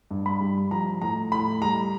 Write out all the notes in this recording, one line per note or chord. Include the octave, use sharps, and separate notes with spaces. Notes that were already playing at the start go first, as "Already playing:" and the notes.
G2
B5
G3
F3 A#5
A2 A#5
A2 B5
G3 A#5